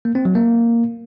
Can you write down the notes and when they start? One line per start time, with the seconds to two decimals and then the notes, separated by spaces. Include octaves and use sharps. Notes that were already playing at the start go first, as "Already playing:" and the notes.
0.05 A#3
0.15 C4
0.25 F#3
0.35 A#3